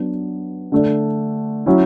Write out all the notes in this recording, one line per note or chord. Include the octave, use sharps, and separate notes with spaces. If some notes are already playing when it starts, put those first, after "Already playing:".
Already playing: F#3 B3 D4
D3 A3 D4
F#3 C#4 E4